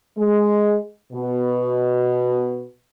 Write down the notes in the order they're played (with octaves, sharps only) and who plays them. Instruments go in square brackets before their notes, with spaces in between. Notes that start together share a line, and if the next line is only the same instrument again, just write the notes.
[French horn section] G#3
B2